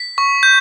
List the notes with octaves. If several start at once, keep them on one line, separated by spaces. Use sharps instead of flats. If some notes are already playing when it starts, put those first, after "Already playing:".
Already playing: B6
C#6
G6